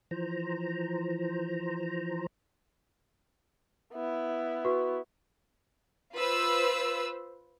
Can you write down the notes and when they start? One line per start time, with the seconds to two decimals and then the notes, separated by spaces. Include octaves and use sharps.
0.11 E3 F3 C5 A#5
3.93 B3 E4
4.65 F#4 B4 C#6
6.14 F4 B4 C5 E6